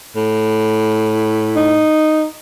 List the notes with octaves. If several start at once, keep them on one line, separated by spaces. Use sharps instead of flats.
A2
D#4